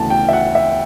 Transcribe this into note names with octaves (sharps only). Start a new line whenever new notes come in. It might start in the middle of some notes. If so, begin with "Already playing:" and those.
Already playing: D2 C#3 E3 B3 A5
G5
E5
F#5
E5